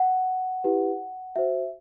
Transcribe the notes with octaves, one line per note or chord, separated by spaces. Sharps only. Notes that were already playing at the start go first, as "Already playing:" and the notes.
Already playing: F#5
E4 G4 B4
F#4 C5 E5